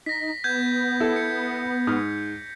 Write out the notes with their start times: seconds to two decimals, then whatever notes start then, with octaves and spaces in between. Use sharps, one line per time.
0.06 D#4 A#6 B6
0.44 B3 G6 G#6
1.00 E4 A4
1.16 C#7
1.87 G#2 D#6 F6